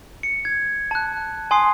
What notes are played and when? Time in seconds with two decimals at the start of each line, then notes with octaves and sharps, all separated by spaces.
0.23 C#7
0.45 G#6
0.91 A5 F#6
1.51 G#5 C6 D#6 C7